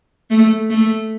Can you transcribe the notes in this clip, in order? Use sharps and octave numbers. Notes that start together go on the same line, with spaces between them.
A3
A3